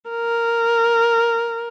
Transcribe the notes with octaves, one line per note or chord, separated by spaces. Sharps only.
A#4